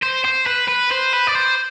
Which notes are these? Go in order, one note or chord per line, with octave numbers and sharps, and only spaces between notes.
C5
C5
B4
B4
C5
B4
D5
C5